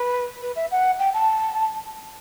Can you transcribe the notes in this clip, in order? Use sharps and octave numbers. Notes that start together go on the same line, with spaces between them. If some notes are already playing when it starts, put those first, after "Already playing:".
Already playing: B4
B4
E5
F#5
G5
A5